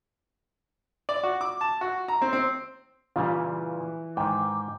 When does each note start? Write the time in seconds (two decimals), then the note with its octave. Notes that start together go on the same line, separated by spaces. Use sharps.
1.09 D5
1.23 F#4
1.41 D6
1.61 A5
1.81 F#4
2.08 A#5
2.22 C4
2.33 C4
3.16 A#2 C#3 E3 G3 F4
4.17 G#2 D#3 G5 D6